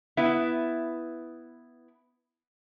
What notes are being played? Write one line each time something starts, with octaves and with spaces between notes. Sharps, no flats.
B3 E4 B4 E5